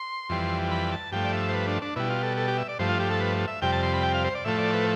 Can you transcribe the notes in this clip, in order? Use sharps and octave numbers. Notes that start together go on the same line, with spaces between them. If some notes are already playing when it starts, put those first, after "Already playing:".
Already playing: C6
F2 E3 G3
B5
A5
G2 F3 A3 G5
D5
E5
C5
B4
D4
D4
B2 G3 E4
F4
A4
A4
G4
E5
D5
G2 F3 A3 C5
F4
G4
A4
B4
E5
F2 C3 G3 G5
A5
C6
B5
G5
F5
C5
D5
A2 F3 A3 E5
D5
B4